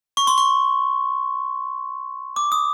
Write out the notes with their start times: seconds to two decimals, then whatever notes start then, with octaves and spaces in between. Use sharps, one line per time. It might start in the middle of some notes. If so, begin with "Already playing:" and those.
0.17 C#6
0.27 C6
0.38 C#6
2.36 D6
2.52 D#6